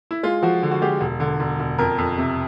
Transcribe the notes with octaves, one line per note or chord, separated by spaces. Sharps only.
E4
G#3 F4
F3 F#4
D3
F#4
G#3 G4
E1
D3
E1
E1
F2 A#4
F2
C3